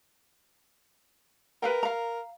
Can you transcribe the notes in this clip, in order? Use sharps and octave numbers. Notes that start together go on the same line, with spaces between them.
A#4 B4 F5 G5
F5 A#5